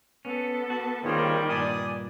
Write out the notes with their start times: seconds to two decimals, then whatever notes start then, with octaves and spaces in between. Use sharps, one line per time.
0.25 B3 C#4 A4
0.70 F#4 A5
1.05 D#2 D#3 G3 C4 F4 G#4 C#5
1.49 G2 A#2 D4 D5 G#5 D#6